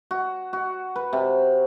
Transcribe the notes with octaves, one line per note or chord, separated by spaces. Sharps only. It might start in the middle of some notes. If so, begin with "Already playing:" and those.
F#4
F#4
B4
C3